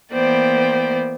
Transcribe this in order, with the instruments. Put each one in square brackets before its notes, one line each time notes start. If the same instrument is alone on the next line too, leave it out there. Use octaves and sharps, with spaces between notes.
[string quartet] E3 A#3 B3 C5 D5 G5